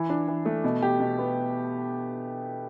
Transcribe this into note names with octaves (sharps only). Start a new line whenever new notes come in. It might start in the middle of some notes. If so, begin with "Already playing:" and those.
Already playing: E3
D4
E3
A3
B2
G4
B2
B3